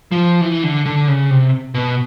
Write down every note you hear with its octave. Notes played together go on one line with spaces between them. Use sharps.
F3
E3
D3
D3
C#3
C3
B2